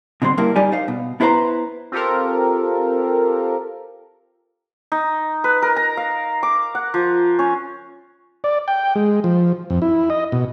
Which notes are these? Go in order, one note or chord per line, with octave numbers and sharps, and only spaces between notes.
B2 D3 G3 C4 C6
G2 A#3 E4
G3 D#4 G4 D5 G#5
D#4 C5 F5
B2
B3 E4 F4 B4 C5 A#5
C4 F4 G4 A4 A#4
D#4
B4
A#4
A#5
F5
D6
F#5
F3
C#4
D5
G5
G#3
F3
F2
E4
D#5
B2